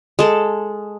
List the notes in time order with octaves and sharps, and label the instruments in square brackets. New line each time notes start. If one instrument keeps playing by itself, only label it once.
[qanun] G#3 A4